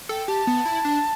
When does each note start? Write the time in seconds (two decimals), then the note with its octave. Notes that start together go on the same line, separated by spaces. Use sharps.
0.09 A4 G5
0.28 G4 A5
0.47 B3
0.65 E4
0.85 D4